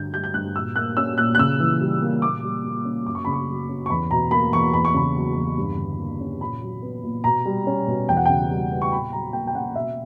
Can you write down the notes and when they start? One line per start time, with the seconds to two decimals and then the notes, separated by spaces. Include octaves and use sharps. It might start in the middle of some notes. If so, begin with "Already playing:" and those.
Already playing: G2 D3 G6
0.13 G3 G6
0.24 G6
0.34 G2 F#6
0.56 A#2 E6
0.76 A#3 F#6
0.97 C#4 E6
1.17 A#2 F#6
1.35 F#6
1.39 C#3 E6
1.60 E3
1.81 G3
2.02 A#3
2.22 A#2 D6
2.43 G3
2.64 A#3
2.85 C#4
3.06 F#2 D6
3.15 C#6
3.25 C#3 B5
3.33 C#6
3.48 F#3
3.69 C#4
3.86 C#6
3.90 E2 B5
4.11 B2 A#5
4.31 A#3 B5
4.52 E2 C#6
4.73 E2 B5
4.85 C#6
4.94 C#3 B5
5.15 F#3
5.36 E2
5.58 G2
5.78 D3
5.99 A#3
6.21 C#4
6.41 A#2 B5
6.61 F#3
6.82 B3
7.03 A#2
7.24 B2 A#5
7.46 G3
7.67 C#4
7.87 B2
8.08 E2 G5
8.17 F#5
8.25 C#3 G5
8.50 G3
8.71 B3
8.82 C#6
8.92 A#2 B5
9.13 F#3 A#5
9.33 A#3 G5
9.47 G5
9.55 C#4 F#5
9.76 B2 E5